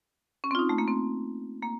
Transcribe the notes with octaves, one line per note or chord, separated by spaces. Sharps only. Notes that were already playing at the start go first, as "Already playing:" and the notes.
C#4
C4
F4
D#4
A3
A#3
C4
A#3